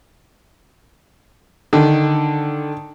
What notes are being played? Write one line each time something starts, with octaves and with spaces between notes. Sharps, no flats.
D3 D#3